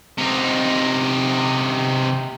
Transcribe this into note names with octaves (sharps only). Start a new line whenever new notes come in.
C3 D#4